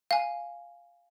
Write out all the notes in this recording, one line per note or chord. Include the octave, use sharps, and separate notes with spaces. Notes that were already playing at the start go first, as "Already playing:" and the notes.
F5 G#5